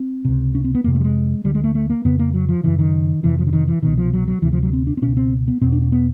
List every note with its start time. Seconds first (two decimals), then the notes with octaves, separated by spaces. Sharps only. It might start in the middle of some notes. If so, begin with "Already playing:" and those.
Already playing: C4
0.25 C#2 C3
0.55 C#4
0.64 C4
0.75 B3
0.84 F2 C3 A#3
0.95 A3
1.00 G3
1.04 G#3
1.44 D2 D3 G3
1.55 G#3
1.64 A3
1.75 A3
1.90 A#3
2.05 F2 C#3 B3
2.19 A#3
2.34 F#3
2.49 F3
2.63 F#2 C#3 E3
2.79 D#3
3.23 F2 C3 E3
3.39 F3
3.47 D3
3.53 D#3
3.68 E3
3.82 C2 B2 D#3
3.98 F3
4.13 F#3
4.28 F#3
4.42 D2 C3 E3
4.52 F3
4.63 F#3
4.73 C4
4.87 D4
4.97 C4
5.02 C#2 B2 C#4
5.17 C4
5.48 B3
5.61 E2 B2 C4
5.72 D4
5.82 C#4
5.92 B3